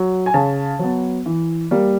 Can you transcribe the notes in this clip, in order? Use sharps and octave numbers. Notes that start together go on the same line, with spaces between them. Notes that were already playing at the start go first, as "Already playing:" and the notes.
Already playing: F#3
G#5
C#3 A5
F#3 B3
E3
G3 A#3